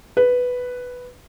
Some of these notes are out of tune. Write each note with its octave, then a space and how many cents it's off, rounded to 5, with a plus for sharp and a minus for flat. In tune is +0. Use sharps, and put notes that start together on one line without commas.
B4 +0